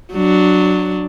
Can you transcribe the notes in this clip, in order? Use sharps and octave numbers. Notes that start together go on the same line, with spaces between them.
F#3 D4